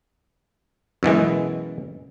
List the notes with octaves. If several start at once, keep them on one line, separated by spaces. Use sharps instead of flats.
F#2 B2 E3 G#3